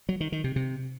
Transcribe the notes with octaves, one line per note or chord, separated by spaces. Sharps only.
F#3
D#3
D#3
C3
C3